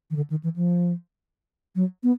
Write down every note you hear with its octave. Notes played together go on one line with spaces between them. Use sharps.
D#3
D3
D#3
E3
F3
F#3
B3